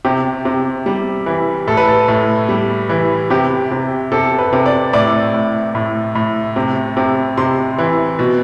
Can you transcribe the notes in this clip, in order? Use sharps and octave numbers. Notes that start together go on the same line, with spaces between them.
C3 G4
C3
G3
E3
A2 A4
B4
A4
A2
G3
E3
C3 G4
C3
C3 A4
B4
C3
D5
A2 D5
A2
A2
A2
C3
C3
C3 C6
E3
B2